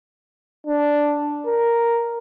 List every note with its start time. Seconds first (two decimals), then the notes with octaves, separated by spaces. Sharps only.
0.67 D4
1.46 A#4